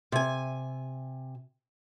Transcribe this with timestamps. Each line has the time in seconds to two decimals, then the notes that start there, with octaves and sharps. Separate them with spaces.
0.12 C3 G#5